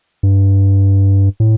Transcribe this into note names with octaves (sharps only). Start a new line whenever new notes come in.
G2
A2